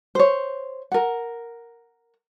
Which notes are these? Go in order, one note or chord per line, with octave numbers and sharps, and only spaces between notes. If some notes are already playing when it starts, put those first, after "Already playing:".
C5 C#5
A#4 F#5